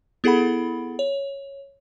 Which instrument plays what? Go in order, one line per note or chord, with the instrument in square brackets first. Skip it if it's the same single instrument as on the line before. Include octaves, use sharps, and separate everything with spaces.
[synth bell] B3 E4 G#4 A4 F#5 B5
C#5